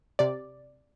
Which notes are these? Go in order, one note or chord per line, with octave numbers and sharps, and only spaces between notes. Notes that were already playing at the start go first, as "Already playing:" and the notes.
C3 D5